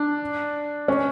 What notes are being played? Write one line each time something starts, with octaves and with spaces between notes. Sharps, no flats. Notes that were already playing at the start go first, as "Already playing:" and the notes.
Already playing: D4
C#4